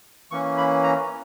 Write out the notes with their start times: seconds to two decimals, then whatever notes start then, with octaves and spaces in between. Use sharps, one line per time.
0.31 E3 A#3 C#4 C#6
0.57 B5
0.83 A#5